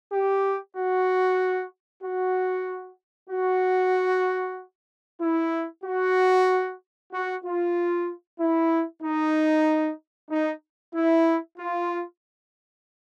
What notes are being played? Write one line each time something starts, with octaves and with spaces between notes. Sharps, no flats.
G4
F#4
F#4
F#4
E4
F#4
F#4
F4
E4
D#4
D#4
E4
F4